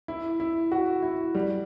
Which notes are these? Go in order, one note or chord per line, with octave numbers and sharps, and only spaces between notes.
E4
E4
F#4
E4
G3